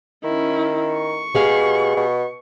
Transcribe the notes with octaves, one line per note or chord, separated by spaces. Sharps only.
D#3 C#4 E4
C#6
B2 G4 G#4 F5
B2